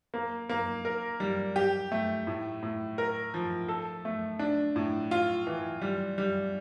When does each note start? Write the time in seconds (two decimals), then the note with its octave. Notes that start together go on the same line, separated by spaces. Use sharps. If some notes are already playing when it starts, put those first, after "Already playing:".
0.14 A#3
0.50 A#3
0.85 A#4
1.20 G3
1.56 G4
1.92 A3
2.27 A2
2.63 A2
2.98 A#4
3.34 F3
3.68 A4
4.05 A3
4.39 D4
4.76 A2
5.11 F4
5.47 E3
5.82 G3
6.18 G3